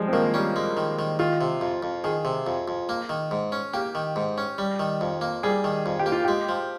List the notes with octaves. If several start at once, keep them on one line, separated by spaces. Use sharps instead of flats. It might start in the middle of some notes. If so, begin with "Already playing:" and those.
Already playing: F3 G3 G#3
C4
D#3 A#3
G3 C#4
G#3
D#3
D#3
D#3 F4
C3
F2
F2
D#3 G#4
C3
F2
F2
A#3
D#3
G#2
C#4
A#3 G4
D#3
G#2
C#4
G3
D#3
F2
A#3
G3 G#4
D#3
F2
G4
A#3
F4
G#3 G4
F3